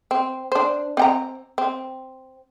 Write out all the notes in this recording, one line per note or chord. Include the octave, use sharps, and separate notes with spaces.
C4
D4 C5
C4 G5 A#5
C4